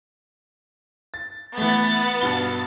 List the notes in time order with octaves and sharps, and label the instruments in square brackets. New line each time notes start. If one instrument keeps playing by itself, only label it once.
[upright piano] A6
[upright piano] E3 A3 [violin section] B3 A6
[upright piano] G2 B2 G7